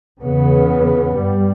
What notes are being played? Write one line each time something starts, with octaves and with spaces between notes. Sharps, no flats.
E2 C#3 B3
G2 G3